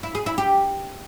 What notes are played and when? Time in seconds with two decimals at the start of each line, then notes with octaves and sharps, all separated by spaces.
0.03 E4
0.15 G#4
0.26 E4
0.38 G4